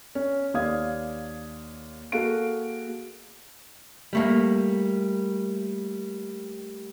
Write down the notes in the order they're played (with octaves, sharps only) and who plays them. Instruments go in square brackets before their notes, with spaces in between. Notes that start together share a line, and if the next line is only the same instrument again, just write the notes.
[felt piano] C#4
D#2 C#5 D5 F5 D#6 G#6
A#3 F#4 G#4 A4 F5 D7
[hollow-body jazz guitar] G3 A3 A#3